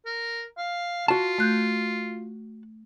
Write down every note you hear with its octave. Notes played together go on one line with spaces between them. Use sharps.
A#4
F5
F4 F#4 A5
A3 F#6 G6